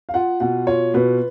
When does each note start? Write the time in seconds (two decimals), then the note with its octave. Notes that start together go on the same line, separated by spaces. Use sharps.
0.09 F5
0.14 F4 F#5
0.40 B2 F#5
0.67 F4 C#5
0.94 B2 B4